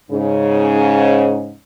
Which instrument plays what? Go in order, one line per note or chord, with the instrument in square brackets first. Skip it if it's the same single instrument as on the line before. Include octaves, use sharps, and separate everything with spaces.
[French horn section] G#2 C#3